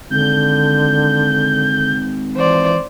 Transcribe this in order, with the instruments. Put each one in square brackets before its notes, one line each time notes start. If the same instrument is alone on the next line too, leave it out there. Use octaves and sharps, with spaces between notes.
[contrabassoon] G#1 [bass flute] D3 [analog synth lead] G6
[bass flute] E3 [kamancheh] C5 D5